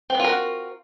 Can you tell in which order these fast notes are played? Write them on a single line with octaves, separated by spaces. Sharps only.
C4 B3 F4 A#4 F#4